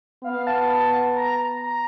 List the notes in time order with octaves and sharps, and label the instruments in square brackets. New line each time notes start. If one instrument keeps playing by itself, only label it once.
[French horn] B3 [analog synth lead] F5
[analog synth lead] A5
A5
A#5
A#5